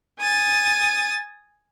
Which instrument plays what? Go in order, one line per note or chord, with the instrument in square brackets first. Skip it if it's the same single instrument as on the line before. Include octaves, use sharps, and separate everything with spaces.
[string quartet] G#5 D#6 A6